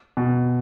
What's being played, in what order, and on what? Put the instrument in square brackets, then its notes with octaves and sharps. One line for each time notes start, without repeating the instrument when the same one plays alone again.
[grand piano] B2